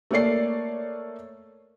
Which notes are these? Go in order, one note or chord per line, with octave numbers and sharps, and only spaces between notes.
A3 A#3 C#5 D5 C7